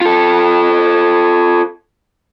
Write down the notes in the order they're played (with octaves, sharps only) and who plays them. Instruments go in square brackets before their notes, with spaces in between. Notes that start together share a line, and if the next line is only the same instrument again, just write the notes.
[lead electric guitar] F4 A4